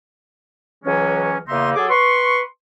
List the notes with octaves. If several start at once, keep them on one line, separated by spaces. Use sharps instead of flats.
C#2 E3 F#3 G#3 C#4
E2 C#3 A#3 D#4 E5 C6
F#3 G#4 A4 D6
B4 C6 C#6